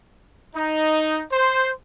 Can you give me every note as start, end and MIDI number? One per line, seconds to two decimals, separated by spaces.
0.54 1.22 63
1.31 1.70 72